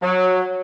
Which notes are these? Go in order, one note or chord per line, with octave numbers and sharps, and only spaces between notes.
F#3